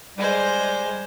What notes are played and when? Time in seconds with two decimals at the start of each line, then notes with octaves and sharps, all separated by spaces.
0.17 G3 G#3 C5